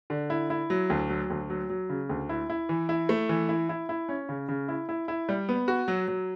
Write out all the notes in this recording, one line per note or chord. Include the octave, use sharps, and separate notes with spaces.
D3
E4
E4
F#3
D2
F#3
D2
F#3
F#3
C#3
D2
E4
E4
E3
E4
A3
E3
E4
E4
E4
C#4
C#3
C#3
E4
E4
E4
G3
B3
F#4
F#3
F#3